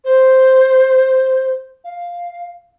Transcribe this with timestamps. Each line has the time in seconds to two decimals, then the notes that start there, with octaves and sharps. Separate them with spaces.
0.04 C5
1.84 F5